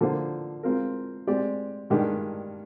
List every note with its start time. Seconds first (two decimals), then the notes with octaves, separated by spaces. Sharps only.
0.01 D3 F3 A#3 F4 C5
0.63 G#3 C4 F4 A#4
1.27 G#3 C4 G4 D5
1.90 G2 D#3 G#3 D4 G4